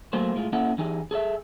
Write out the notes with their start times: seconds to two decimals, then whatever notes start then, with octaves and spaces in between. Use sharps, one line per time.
0.13 F#3 A3 A#3 C5
0.35 A2 G#3 F4
0.53 A#3 C#4 E4 A4 F#5
0.78 E3 D#4 G4 G#4
1.11 G#4 A4 C#5 E5